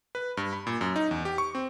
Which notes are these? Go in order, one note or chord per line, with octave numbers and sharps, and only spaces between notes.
B4
G2
B5
A#2
F#2
D#4
E2
G4
C#6
C4